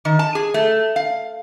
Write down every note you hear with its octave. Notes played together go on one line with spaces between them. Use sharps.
D#3
A5
G#4
A3
F5